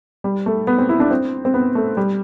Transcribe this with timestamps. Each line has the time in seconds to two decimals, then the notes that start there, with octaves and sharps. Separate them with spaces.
0.24 G3
0.46 A3
0.67 B3
0.78 C4
0.89 E4
1.00 D4
1.11 C4
1.45 C4
1.54 B3
1.75 A3
1.97 G3